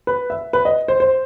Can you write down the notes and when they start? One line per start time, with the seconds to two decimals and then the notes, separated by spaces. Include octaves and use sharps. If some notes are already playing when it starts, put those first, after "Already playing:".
0.07 B4
0.30 E5
0.53 B4
0.65 D#5
0.88 C5
1.00 C5